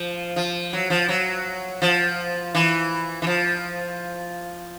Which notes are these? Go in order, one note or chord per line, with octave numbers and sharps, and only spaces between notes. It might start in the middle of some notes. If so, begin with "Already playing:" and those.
Already playing: F3
F3
F#3
F3
F#3
F3
E3
E3
F3